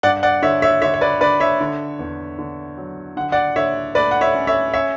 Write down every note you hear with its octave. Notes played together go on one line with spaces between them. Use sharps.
G2 D5 F#5
D5 F#5
D3 C#5 E5
C#5 E5
D3 C#5 E5
C#5
B4 D5
D3 B4 D5
C#5 E5
D3
E2
D3
F#3
D3 F#5
D5 F#5
D3 C#5 E5
A3 B4 D5
F#5
C#5 E5
C#4
C#5 E5
C#4 C#5 E5